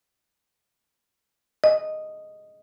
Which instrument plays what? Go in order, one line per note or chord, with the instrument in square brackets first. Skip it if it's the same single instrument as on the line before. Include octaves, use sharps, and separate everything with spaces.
[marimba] D#5